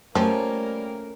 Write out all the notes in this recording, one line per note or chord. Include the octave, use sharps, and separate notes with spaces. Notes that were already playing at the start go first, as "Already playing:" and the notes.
F3 G3 A3 A#3 C#4 A#4